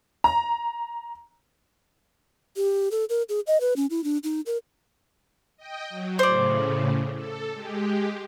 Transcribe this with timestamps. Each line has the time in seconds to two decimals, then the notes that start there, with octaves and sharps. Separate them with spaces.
0.24 A#5
2.57 G4
2.91 A4
3.09 A#4
3.29 G#4
3.47 D#5
3.60 B4
3.76 C#4
3.90 E4
4.04 D4
4.24 D#4
4.46 A#4
5.57 D#5 G5
5.89 F#3
6.19 A2 C#3 C5 D5
7.14 A4
7.53 G#3 G4